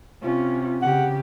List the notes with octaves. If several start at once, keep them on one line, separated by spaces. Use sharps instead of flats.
C3 C#4 F4
C#3 G4 F#5